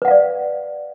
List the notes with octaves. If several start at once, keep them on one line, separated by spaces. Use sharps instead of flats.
B4 D5 F5 F#5